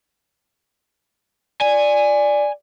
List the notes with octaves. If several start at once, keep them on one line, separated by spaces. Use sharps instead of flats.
D5 G#5